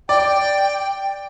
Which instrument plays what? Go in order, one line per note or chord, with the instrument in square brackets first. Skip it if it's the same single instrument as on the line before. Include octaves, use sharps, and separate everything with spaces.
[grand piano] D5 [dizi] G5